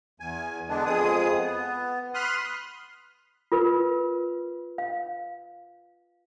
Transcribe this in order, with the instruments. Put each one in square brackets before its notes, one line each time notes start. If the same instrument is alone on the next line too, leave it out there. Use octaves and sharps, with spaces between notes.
[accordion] E2 G#5
D3 G#3 B3 D4
F2 G#3 G#4 D#6
B3
B5 C6 D#6 F6 F#6
[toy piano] F4 A#4 B4
F5